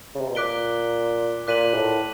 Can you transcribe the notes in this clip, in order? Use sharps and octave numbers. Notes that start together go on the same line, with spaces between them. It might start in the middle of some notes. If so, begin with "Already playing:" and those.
C#3
C3
B2
A#2 D6 F#6 B6 D7 G7
A#2 D6 F#6 B6 D#7 F#7
A2